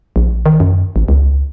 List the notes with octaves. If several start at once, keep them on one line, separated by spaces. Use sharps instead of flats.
A#1
D#3
F#2
A1
C#2